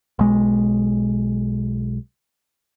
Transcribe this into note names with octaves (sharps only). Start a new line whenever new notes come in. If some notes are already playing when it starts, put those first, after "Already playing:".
B1 G#3